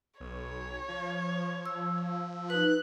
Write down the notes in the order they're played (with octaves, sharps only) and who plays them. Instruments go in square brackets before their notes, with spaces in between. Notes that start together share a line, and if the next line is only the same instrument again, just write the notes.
[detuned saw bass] B1 [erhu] C#5
[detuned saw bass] F3
[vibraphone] E6
[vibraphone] D#4 B4 [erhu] F#6